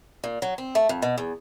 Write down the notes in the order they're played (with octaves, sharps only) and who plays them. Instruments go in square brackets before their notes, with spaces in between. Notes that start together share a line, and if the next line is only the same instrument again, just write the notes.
[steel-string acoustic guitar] A#2
F#3
C4
A3
F2
B2
E2